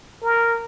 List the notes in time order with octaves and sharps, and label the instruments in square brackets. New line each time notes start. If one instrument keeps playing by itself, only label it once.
[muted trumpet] A#4